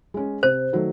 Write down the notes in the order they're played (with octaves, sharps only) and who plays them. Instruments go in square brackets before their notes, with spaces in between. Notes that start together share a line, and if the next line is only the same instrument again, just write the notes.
[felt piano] G#3 C#4
[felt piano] C3 [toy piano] C5
[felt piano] D#3 F#3 A3